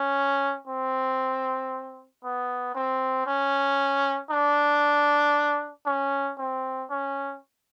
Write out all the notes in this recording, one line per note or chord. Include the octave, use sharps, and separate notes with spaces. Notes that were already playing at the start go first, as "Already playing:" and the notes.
Already playing: C#4
C4
B3
C4
C#4
D4
C#4
C4
C#4